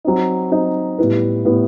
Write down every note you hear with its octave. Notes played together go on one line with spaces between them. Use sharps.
F#3 C4 D#4
F#3 C4 D#4
A2 G3 B3 E4 B4
A2 G3 B3 E4 B4